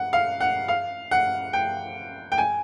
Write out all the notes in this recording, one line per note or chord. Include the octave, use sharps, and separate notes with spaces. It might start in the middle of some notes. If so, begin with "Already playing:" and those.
Already playing: F#5
F5
F#5
F5
F#5
G5
G5
G#5